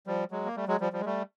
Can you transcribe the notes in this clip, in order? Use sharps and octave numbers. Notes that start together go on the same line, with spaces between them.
F3 G3
F#3 G#3
A#3
G3 A3
F#3 G#3
F3 G3
F3 G3
G#3
G3 A3